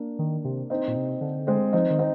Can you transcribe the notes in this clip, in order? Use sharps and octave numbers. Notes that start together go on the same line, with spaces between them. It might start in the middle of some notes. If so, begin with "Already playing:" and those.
Already playing: A#3 D4
D#3
C3
C4 D#4
A#2
C3
D3
G#3 C4
F3 C4 D#4
D#3
C4 D#4